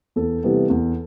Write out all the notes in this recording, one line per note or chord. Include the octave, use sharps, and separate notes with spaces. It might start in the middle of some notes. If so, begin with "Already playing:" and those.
E2 A4
C3 E3 G3 B3
E2